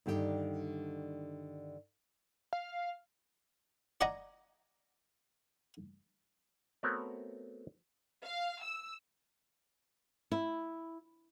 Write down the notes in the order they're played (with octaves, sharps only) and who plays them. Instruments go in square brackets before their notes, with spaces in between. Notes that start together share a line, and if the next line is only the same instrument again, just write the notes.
[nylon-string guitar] G2 D3 D#3 G4
[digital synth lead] F5
[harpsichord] D5 D#5 F#5 G#5 A#5
[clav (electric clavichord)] A3 B3 C4 F#4 A#4 C#5
[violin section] F5
E6
[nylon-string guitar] E4